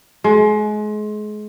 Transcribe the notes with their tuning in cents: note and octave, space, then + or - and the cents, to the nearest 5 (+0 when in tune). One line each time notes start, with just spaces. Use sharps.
G#3 +30